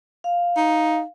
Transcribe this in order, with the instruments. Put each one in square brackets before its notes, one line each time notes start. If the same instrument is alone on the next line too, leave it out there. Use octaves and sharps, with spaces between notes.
[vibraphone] F5
[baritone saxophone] D#4